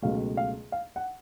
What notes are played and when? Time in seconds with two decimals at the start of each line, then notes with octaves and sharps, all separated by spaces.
0.02 C#2 B2 F#3 A3 F5
0.37 F5
0.72 F5
0.96 F#5